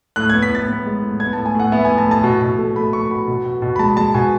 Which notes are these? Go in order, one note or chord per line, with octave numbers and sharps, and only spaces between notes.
A2 F#6
B3 G#6
B6
A2 A6
B3
G#3
A2
B3 G#6
A2 A5
G#5
A2
F#5
B3 E5
G#5
A2
A5
A2
A5
B2
B2
A3
A3 B5
A3 C#6
B2 B5
B2
B2
B2
B5
G#3 A5
G#3 A5
B2 G#5